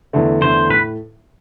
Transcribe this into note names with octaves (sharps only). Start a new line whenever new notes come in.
E2 D3 A3
E2 D3 A3 C5
A2 B4